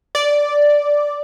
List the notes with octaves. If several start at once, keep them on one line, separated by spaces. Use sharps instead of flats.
D5